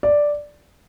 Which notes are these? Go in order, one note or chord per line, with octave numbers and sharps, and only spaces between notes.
D5